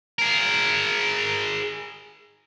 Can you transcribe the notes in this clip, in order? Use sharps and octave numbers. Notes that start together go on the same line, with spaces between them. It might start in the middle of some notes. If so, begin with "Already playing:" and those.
G#4 A#4